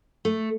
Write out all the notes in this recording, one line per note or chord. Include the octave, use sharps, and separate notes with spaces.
A3